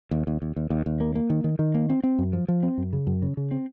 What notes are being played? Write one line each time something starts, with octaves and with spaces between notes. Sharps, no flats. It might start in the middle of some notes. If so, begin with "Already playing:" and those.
D#2
D#2
D#2
D#2
D#2
D#2
A#3
A#3
D#3
D#3
D#3
A#3
C4
C4
F#2
F3
F3
C4
F#2
C#3
F#2
C#3
C#3
C4